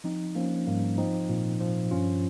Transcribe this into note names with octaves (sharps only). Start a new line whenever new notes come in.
F3 C4 D#4
F3 A#3 C#4
G#2 G3 A#3
F3 C4 D#4
A#2
F3
G2 C#4 F4